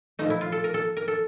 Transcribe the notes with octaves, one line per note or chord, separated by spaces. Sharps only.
A#2 F3 A3 D#4
E4
F4
A4
A#4
A4
A#4
A4